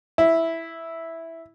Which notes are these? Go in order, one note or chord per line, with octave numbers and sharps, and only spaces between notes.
E4